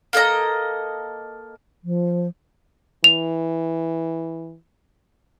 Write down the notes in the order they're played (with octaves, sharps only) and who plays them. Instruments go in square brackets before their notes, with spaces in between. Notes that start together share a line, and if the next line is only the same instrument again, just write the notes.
[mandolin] A#3 A4 D#5 A#5
[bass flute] F3
[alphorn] E3 [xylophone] F7